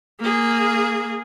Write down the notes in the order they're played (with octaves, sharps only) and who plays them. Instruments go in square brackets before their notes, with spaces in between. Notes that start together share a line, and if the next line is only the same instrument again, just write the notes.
[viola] A#3 G#4